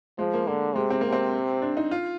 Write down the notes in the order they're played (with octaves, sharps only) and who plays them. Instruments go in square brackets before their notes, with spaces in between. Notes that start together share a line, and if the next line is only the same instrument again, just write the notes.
[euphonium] F3 [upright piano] G#3
[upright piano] A#3
[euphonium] D3 [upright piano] A#3
[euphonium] C3 [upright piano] G#3
[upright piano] C4
[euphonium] C3 [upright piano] A#3
[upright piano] C4
D4
D#4
F4